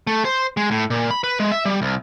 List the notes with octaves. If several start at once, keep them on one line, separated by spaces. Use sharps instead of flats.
A3
C5
G#3
A2
A#2
B5
B4
G#3
E5
G3
C2